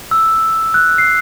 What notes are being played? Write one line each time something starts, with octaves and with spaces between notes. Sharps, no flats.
E6
F#6
C7